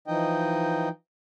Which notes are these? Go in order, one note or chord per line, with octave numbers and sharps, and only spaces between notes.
E3 F3 D#4 D#5 G5